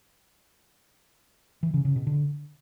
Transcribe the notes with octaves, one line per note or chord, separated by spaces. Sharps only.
E3
C#3
C#3
B2
D3